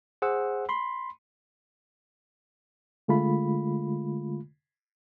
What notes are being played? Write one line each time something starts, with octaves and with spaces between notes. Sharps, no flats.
G#4 C5 F#5 E6
B5 C6
D3 G#3 A3 F4 B5